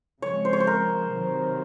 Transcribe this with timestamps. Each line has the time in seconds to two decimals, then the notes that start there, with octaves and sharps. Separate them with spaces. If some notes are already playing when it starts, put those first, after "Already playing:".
0.22 C#3 F3 G#3 C4 C#5
0.45 C5
0.53 C#5
0.60 C5
0.67 A#4
1.12 C3 D#3 F#3